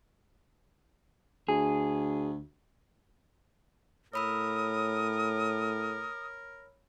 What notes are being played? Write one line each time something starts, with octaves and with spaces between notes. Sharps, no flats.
D2 G#4
A2 A#4 C#5 B5 D#6 E6